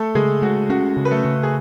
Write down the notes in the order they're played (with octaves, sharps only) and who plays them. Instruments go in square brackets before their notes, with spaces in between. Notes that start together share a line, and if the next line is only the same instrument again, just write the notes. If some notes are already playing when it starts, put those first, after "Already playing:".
Already playing: [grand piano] A3 A4
[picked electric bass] C#3 [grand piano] G#3 G#4
[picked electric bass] G#3 [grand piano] F#4
[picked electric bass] C#4 [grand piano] F#4
[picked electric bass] C#3
[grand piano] B4
A3 A4
[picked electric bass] C#3
[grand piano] G#4